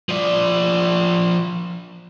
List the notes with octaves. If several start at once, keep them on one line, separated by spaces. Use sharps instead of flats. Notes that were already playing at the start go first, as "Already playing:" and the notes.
F3 D5